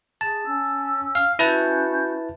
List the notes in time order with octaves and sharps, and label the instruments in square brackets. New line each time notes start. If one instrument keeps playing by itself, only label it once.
[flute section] G#4 [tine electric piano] A5
[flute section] C#4 E6
[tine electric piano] F5
[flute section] C#4 F#4 G6 [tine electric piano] E4 B4 A5